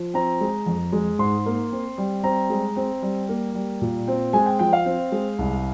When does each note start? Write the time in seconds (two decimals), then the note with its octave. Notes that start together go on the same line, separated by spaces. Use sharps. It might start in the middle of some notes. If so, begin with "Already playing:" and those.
Already playing: F3
0.14 C4 A#5
0.41 G#3
0.66 F2
0.92 G#3
1.19 G#2 C6
1.46 A#3
1.72 C4
1.98 G3
2.23 C4 A#5
2.50 G#3
2.76 C4
3.02 G3
3.29 A#3
3.55 G3
3.82 A#2
4.08 C4
4.33 G#3 G#5
4.46 G5
4.59 F3 G5
4.73 F5
4.85 C4
5.12 G#3
5.38 C2